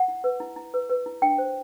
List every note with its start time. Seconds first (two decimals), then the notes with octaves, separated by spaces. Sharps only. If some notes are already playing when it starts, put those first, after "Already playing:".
Already playing: F#5
0.08 E4
0.24 B4
0.40 E4
0.56 E4
0.74 B4
0.89 B4
1.06 E4
1.22 D4 G5
1.38 C5